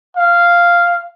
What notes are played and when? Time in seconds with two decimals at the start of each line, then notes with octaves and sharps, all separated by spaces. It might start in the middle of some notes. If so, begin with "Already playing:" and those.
0.16 F5